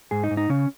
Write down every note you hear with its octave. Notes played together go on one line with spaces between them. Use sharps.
G#2 G#4
D#4
G#2
D#4
C#3 C#4